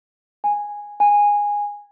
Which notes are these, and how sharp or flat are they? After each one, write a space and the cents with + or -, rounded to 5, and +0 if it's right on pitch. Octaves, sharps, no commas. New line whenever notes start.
G#5 -5
G#5 -10